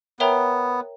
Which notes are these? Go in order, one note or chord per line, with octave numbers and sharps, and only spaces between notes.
B3 A#4 C#5 E5 G5 A#5